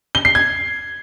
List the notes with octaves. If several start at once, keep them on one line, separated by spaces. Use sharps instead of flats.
G7
C7
G#6